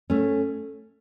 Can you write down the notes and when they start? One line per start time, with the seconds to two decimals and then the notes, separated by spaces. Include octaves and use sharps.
0.10 A3 C#4